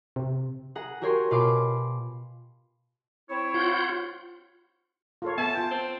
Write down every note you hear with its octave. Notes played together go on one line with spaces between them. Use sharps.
C3
G#4 F#5 A#5
F#4 G4 A#4 C#5 G#5 C6
B2 F4 F5 B5 C6 D6
C4 E4 C#5
F4 F#5 G6
F4 A4 C#5
B3 E5 G#5 A5
F4 G5
C4